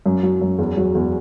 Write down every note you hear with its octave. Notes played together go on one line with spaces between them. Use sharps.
F#2
F#3
F#2
E2
F#3
E2